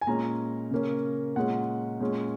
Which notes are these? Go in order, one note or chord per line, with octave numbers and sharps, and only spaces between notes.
G#5
A#2 G#3 C#4 A#5
C#3 A#3 C#4
A#2 G#3 C#4 F#5
A#2 G#3 C#4